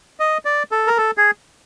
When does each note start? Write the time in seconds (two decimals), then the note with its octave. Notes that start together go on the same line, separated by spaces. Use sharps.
0.20 D#5
0.45 D5
0.71 A4
0.87 A#4
0.98 A4
1.17 G#4